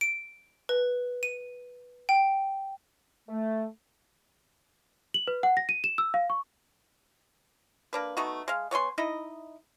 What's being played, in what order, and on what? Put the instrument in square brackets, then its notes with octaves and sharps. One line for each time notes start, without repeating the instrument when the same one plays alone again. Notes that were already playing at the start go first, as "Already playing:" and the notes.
[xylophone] D7
B4
D#7
G5
[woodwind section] A3
[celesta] F#7
B4
F#5
A#6
D#7
E7
E6
F5
C#6
[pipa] A#3 D4 B4
A3 B3 D#4 F#4
G#3 F5
B3 C#5 G#5 C6
D#4 E4 D#5